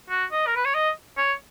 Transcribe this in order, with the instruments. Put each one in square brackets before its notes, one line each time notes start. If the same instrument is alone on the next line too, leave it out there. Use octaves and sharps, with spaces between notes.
[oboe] F#4
D#5
A#4
B4
C#5
D#5
C#5